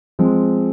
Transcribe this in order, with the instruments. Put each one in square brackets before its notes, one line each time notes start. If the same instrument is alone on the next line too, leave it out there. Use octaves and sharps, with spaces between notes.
[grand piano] F3 G#3 C4